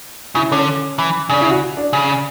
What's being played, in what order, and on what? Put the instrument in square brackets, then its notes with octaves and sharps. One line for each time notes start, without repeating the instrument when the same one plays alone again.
[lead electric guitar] C#3 [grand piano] E4
[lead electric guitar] D3 [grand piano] C#4
[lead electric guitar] E3
[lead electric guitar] C#3 [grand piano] D4
[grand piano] E4
F#4
D4
[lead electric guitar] C#3